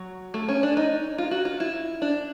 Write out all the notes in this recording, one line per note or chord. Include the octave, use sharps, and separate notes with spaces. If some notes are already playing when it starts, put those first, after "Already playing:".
Already playing: F#3
A3
C#4
D4
D#4
F4
F#4
F4
E4
D4